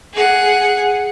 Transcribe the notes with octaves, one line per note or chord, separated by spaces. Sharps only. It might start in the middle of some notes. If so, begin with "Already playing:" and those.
G#4 F#5